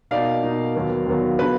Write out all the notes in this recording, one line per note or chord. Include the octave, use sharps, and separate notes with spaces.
B2 A#3 D#4 D5 F5
B2 A#3 D#4
D#2 D#3 F#3 B3
D#2 D#3 F#3 B3
D3 F#3 B3 F4 B4